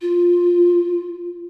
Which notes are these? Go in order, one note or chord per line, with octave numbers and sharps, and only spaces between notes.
F4